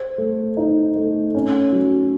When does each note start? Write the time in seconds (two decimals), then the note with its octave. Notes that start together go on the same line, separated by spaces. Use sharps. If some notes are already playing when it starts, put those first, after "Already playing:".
Already playing: C5
0.18 A3
0.57 D#4
0.96 A3
1.35 C#4
1.72 F#3